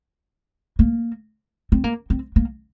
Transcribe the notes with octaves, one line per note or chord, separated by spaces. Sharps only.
A#3
C4
A#3
C4
A#3